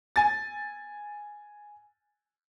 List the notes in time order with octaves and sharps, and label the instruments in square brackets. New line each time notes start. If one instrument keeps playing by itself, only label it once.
[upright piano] G#5 A6